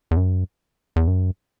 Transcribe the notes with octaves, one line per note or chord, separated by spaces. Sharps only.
E2
F#2
E2
F#2